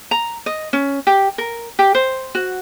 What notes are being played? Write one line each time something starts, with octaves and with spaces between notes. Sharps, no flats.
A#5
D#5
C#4
G4
A#4
G4
C5
F#4